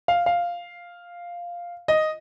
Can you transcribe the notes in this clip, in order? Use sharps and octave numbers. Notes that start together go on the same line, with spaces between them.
F5
F5
D#5